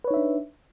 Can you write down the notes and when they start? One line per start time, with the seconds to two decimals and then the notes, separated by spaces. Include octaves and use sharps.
0.04 B4
0.08 C#5
0.11 D#4
0.14 E5
0.17 D4